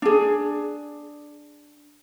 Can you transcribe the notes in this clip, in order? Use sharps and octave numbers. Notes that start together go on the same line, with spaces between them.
D4 G#4